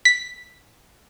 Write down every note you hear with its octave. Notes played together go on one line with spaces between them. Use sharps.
B6